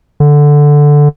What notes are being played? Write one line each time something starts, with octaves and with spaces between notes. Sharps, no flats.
D3